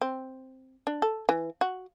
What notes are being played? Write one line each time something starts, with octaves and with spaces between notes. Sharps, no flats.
C4
D4
A4
E3
F#4